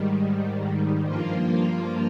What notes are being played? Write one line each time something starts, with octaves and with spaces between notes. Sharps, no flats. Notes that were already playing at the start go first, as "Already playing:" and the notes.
Already playing: G#2 D#3 G3
G2 F3 A#3 F4